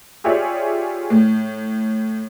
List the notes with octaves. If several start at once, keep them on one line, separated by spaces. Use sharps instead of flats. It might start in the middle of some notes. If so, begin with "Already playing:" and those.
F4 G4 G#4 C#5 D5 E5
A2